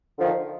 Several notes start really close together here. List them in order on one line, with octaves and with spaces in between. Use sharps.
D3 F3 D#3